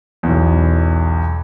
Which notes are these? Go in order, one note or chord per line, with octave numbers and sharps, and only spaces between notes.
B1 E2